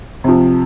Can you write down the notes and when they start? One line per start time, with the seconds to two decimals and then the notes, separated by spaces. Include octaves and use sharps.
0.24 C3 F3